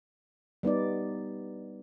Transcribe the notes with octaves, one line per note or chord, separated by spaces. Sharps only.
G3 B3 D#4 D5